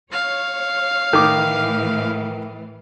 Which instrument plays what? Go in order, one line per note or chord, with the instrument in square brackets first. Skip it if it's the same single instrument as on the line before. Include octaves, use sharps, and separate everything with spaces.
[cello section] C#5 [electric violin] F5
[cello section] A2 E3 [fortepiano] D#3 D6